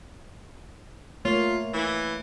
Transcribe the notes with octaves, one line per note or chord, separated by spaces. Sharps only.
A3 A#3 F4 C#5
E3